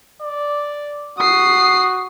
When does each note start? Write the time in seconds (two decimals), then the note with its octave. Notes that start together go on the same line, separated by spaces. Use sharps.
0.22 D5
1.18 F#4 D#6 C7